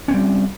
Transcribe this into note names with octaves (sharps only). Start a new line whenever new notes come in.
G3 C4 C#4